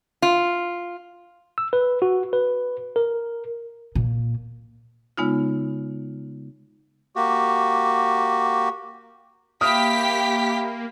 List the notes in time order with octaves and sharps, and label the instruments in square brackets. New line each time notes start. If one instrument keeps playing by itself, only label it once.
[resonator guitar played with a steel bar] F4
[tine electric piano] E6
B4
F#4
B4
A#4
[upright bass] A#2
[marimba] C#3 G#3 B3 D#4 F4
[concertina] A#3 F#4 G4
[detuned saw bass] A#3 [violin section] G4 B6 [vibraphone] E5 F5 B5 [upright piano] D#6 F6